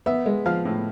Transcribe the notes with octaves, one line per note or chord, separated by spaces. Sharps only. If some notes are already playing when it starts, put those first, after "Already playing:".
B3 E5
G#3
F3 F5
A2